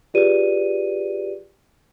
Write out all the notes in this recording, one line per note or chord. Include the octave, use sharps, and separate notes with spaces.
F4 G4 G#4 B4 D5 D#7